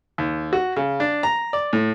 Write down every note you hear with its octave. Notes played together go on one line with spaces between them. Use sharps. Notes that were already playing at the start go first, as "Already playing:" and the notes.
D#2
F#4
C#3
D4
A#5
D5
A2